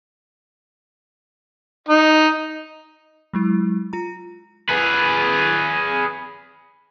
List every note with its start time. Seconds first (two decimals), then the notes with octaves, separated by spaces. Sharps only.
1.88 D#4
3.34 F#3 G#3 E4
3.93 F4 A#5
4.69 G#4 B4